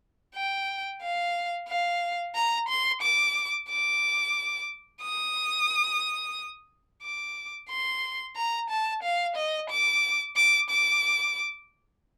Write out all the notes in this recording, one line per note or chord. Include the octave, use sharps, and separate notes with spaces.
G5
F5
F5
A#5
C6
D6
D6
D#6
D6
C6
A#5
A5
F5
D#5
D6
D6
D6